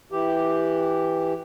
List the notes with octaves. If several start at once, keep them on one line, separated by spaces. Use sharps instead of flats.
E3 G4